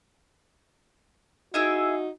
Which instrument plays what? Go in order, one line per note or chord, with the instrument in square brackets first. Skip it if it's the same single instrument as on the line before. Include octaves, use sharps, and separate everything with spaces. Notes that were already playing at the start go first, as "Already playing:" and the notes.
[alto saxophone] D#4 [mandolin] E4 G#4 E5 [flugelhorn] F#4